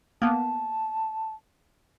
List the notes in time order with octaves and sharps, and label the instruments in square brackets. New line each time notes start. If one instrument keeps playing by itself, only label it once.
[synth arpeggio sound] A#3 B3 [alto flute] A5